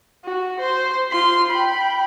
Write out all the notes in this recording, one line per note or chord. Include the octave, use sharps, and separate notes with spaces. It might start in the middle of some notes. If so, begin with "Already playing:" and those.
F#4
C5 C6
F4 C6
G5 B5